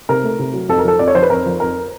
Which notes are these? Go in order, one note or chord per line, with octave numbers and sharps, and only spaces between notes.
C3 A#4
A3
C3
F#3
F2 A4
A#4
F3 A4
F2 D5
C#5
F3 C5
B4
F2 A#4
F3
F2 A#4